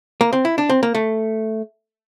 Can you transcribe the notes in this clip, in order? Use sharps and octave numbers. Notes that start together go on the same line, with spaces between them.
A#3
C4
E4
D4
C4
A#3
A3